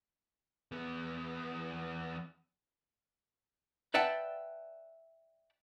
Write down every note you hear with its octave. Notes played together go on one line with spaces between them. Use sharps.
E2 B3
B4 D5 E5 F#5 G5 A5